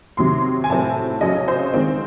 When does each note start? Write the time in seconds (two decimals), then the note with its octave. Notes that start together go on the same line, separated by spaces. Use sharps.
0.17 C3 D#3 F#3 C6
0.64 G#5
0.70 A2 F#3 C4 A5
1.21 C#3 F#3 C#4 D#5
1.48 C5
1.74 D#3 G#3 C4